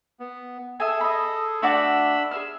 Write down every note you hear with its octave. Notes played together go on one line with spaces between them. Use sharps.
B3
G#4 A4 E5 G#5
D#5 B5
A3 D4 F#4 D5 B5 E6
G#4 E5 F6